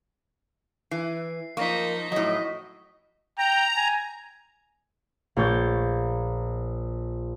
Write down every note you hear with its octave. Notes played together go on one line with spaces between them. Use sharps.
E3 C7
F3 A#3 D#4 C#6 A#6 B6
A2 F#3 D#5
G5 A#5
G#5
A#1 A#3 C#5 G6 A6